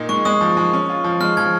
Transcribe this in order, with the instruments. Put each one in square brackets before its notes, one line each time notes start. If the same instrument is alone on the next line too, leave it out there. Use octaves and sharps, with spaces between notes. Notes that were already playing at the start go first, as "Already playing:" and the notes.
Already playing: [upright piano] A#2 D#4
[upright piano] G#3 [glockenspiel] C#6
[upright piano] G#3 [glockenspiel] D#6
[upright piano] F3
G#3
C#4
F4
F3
[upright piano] G#3 [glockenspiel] F6
[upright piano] F3 [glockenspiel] G#6